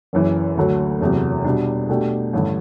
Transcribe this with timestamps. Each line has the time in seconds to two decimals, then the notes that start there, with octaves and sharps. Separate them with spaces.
0.13 F#1 F#2 E3
0.57 D2 D3 F#3 A3
1.00 F#1 E2 C3 F#3
1.44 B2 G3 D4
1.89 B2 A3 D4 G4
2.33 A1 G2 D3